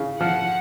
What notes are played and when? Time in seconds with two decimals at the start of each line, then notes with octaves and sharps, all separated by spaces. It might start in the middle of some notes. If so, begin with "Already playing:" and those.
Already playing: C#3
0.20 F3 F#5